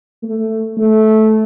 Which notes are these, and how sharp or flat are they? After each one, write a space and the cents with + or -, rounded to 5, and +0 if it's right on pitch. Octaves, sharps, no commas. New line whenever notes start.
A3 +10
A3 -15